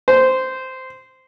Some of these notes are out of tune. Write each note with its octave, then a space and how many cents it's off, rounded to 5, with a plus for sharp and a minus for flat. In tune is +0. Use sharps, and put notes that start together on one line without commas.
C5 -10